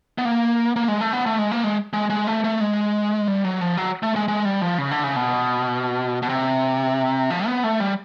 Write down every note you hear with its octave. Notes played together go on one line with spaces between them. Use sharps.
B3
A#3
A#3
G#3
A3
B3
A3
G#3
A#3
G#3
G#3
G#3
A3
A3
G#3
G3
F#3
F3
F#3
A3
G#3
G#3
G3
F3
C#3
D3
C#3
B2
B2
C3
F3
B3
A3
G3